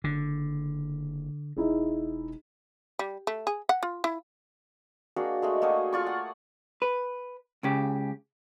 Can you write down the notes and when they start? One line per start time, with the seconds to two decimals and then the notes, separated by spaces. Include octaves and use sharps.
0.04 F#1 D3
1.57 E1 D#4 E4 G#4
2.99 G3
3.27 A3
3.47 G#4
3.69 F#5
3.83 F4
4.04 E4
5.16 A#3 D4 F#4 G#4
5.42 G#3 A3 G#4
5.62 A3 A#3 F#4 G#4
5.92 F4 D5 C#6
6.07 F#5
6.82 B4
7.63 C#2 C#3 G4